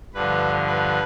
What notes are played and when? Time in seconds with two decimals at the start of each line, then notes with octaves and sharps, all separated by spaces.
0.14 G2 D3 F3 B4
0.66 B4